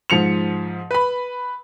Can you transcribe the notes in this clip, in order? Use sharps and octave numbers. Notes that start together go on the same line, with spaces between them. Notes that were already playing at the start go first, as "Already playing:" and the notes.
G#2 F3 C#7 F7
B4 B5